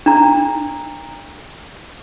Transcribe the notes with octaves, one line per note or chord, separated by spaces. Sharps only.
D4 A#5